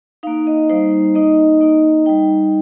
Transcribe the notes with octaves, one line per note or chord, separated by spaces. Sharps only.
A#3 D#4 F5
D#5
G3 A#3 D#4 C5
A#3 D#4 D#5
A#3 D#4
G3 D#4 G5